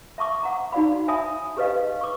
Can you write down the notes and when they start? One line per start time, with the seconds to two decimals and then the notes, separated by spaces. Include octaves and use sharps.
0.18 E5 A5 C#6 D6
0.43 F#5 A#5
0.72 D#4 F#4 D5 F5 B5
1.08 C#5 E5 G#5 A5 B5 D#6
1.57 G4 G#4 B4 C#5 D#5 F5
2.01 C#6 D6